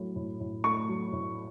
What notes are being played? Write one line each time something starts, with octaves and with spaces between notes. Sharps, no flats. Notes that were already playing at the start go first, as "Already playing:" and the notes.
Already playing: A2 F#3 A3
A2
A2
A3 C#6
F#3
A2